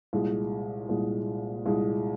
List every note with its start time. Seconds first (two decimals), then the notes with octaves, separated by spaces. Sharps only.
0.13 C2 A#2 G#3
0.89 C2 A#2 G#3
1.66 C2 A#2 G#3